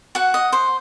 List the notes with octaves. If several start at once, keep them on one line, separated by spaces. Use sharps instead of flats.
F#4 F#5
D#5
C5